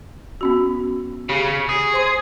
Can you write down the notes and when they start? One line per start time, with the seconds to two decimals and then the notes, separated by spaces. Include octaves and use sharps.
0.41 B3 C#4 F#4
1.29 C#3 G4
1.69 G#4
1.94 C5 C6